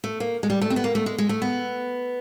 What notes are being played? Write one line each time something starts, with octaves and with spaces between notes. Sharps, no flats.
A3
A#3
G#3
G3
A3
C4
B3
A#3
A3
G#3
G#3
A3
B3